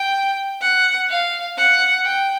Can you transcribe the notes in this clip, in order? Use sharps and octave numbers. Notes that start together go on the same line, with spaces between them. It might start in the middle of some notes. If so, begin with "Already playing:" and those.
Already playing: G5
F#5
F5
F#5
G5